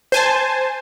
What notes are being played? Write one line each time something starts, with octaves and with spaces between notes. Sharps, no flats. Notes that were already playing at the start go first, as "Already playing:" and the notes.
C5 G#5 A5